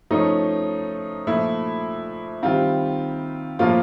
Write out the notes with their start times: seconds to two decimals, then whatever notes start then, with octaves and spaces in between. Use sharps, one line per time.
0.11 F3 A3 C#4 D#4
1.27 A#2 F3 A3 E4
2.43 D#3 G3 C4 F4
3.59 A2 F3 A#3 F4